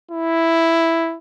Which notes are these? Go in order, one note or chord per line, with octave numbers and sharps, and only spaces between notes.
E4